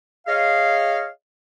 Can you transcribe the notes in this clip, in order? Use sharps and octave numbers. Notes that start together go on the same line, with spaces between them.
G#4 C#5 D#5 F5